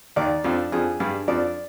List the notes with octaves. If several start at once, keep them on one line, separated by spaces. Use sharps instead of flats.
D#2 D#3 D5
F2 F3 D4
F2 F3 G#4
G2 G3 D4
F2 F3 D5